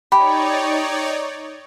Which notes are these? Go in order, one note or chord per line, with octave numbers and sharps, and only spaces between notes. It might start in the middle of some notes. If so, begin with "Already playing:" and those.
D#4 G4 C#5 D5 B5